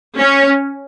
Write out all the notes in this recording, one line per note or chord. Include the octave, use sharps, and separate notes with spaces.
C#4